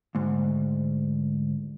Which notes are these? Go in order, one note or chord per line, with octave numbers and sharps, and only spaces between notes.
D2 G#2